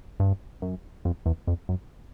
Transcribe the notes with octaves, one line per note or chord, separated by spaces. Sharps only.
G2
F#2
F2
E2
F2
F#2